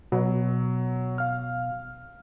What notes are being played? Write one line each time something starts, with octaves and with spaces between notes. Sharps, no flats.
B2 F#3
F5 F6